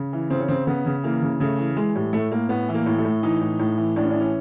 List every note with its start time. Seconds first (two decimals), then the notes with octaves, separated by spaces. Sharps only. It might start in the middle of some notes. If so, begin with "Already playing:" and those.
Already playing: C#3
0.13 E3
0.30 C#3 C4
0.40 C#4
0.48 C#3 C4
0.67 C#3 B3
0.86 C#3
1.04 E3 A#3
1.22 C#3
1.40 C#3 A3
1.58 E3
1.76 E3 G#3
1.95 A2 G3
2.13 A2 A3
2.31 A2 A#3
2.49 A2 B3
2.69 E3
2.74 A#3
2.86 A2
2.98 A3
3.05 A2
3.23 E3 D#4
3.41 A2
3.59 A2
3.78 E3
3.96 A2 D4
4.03 C#4
4.10 D4
4.14 E3
4.20 C#4